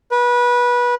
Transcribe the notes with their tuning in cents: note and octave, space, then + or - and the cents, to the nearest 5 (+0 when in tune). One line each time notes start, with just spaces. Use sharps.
B4 -25